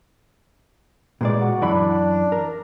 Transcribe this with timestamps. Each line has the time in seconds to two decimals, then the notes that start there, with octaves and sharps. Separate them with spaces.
1.21 A#2 E3 G#3 D5
1.41 F#4
1.62 F#2 E3 D4 B5
2.32 A#4